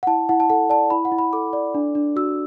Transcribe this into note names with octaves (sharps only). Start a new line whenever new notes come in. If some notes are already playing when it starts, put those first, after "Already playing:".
F#5
E4 A5
E4 F#5
A5
A4 F#5
D5 A5
E4 B5
F#5
E4
B5
A4 D6
D5
D4
D4
F#4 E6